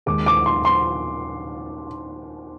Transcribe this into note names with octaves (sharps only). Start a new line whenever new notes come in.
D#2 D#3 G#3 D6
D6
C6
C6